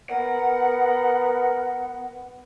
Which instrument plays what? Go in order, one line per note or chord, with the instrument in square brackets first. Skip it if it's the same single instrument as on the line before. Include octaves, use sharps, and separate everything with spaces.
[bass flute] B3 [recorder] A#4 [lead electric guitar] F#5